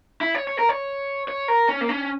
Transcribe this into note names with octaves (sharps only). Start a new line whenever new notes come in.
E4
C#5
C#5
A#4
C#5
C#5
A#4
C#4
A#3
C#4